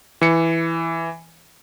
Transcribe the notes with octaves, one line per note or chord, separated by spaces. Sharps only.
E3 C#7